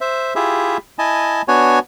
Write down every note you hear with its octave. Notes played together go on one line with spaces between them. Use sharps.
C5 E5
E4 F4 G4 G#4 E5
E4 D#5 G#5 A5
B3 D4 F#4 C#5 G#5